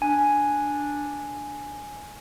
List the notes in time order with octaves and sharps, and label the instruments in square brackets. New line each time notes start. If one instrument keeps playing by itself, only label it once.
[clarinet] D4 [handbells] G#5